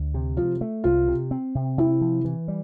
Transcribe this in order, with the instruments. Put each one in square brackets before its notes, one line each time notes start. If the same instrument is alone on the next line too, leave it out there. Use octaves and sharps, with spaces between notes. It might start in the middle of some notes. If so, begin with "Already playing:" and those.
Already playing: [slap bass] D2
C3
[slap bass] F3 [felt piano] F4
[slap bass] A3
[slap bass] C2 [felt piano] F4
[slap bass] C3
C4
C3
[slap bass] C3 [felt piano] E4
[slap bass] F3
E3
G3